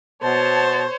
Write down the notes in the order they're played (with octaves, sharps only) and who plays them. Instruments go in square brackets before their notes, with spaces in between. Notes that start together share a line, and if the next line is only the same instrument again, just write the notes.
[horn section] B2 A5 [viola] C5 C#5